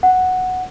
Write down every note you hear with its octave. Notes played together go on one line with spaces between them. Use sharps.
F#5